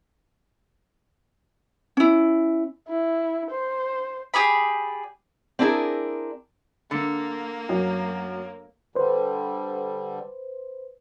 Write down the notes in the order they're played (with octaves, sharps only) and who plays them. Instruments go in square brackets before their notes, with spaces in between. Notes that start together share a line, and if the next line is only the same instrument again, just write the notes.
[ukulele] C#4 E4
[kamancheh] E4
C5
[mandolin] G4 G#4 D5 B5
[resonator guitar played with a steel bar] C4 D4 E4 G#4 A#4
[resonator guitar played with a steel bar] D3 [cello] A#3
[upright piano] F#2
[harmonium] D3 G3 [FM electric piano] B4 C5